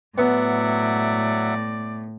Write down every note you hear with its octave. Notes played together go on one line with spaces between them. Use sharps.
A2 F#3 B3 D5 E5 F#5